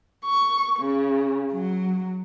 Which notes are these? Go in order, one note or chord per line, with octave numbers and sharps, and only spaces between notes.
C#6
C#3
F#3